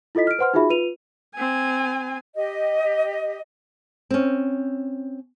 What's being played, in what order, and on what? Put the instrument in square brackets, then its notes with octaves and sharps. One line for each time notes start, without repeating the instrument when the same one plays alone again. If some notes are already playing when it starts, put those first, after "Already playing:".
[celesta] E4 F4 A4 D#5 B6
F6 D7
B4 C5 F#5 C6 F6
D#4 F4 F#4 G#4 E5 B5
F4 B4 D#7 F7
[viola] C4 G#5
[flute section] G4 D#5
[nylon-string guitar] C4 C#4